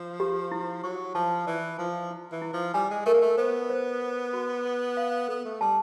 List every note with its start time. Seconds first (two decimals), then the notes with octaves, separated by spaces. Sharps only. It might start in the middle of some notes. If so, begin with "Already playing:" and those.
Already playing: F3
0.20 G4
0.52 E4
0.84 F#3 C#6
1.15 F3 A5
1.47 E3 D5
1.78 F3 A5
2.11 E4
2.32 E3
2.42 E4
2.53 F3
2.74 G3 G#5
2.91 G#3
3.06 A3 A#4
3.14 A#3
3.22 A3
3.38 B3 C5
3.70 C5
4.01 C5
4.33 F#4
4.65 B4
4.97 F5
5.28 B3 A4
5.45 A3
5.61 G3 A5